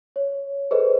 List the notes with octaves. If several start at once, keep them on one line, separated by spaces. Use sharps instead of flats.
C#5
G#4 A4 B4 C5 D5 D#5